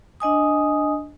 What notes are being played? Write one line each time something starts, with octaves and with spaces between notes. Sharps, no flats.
D4 D#5 G#5 D#6